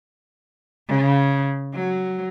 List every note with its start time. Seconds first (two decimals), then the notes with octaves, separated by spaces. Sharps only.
0.89 C#3
1.75 F#3